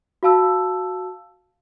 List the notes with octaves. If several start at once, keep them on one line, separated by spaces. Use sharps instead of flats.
F#4 F5 A5 E6